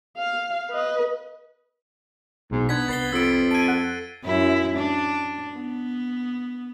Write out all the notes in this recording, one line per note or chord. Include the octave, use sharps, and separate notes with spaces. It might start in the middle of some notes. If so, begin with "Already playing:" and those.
F5
B4 D#5
B1 G#2 B2
B3 D4 G#6 B6
C2 B4 A6 C7 G7
F2 E6 D7
A5 G#6 D7 D#7
A4 F#5
F#2 E4
D4
B3